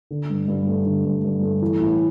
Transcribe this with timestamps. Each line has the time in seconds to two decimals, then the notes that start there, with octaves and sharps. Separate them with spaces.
0.11 D3
0.30 G2
0.48 G2
0.67 A3
0.86 D3
1.05 G2
1.24 G2
1.43 A3
1.62 E3
1.81 A2